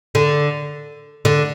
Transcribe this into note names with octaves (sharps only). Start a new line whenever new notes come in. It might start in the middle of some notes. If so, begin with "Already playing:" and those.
D3
D3